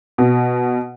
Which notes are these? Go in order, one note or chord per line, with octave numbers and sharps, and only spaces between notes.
B2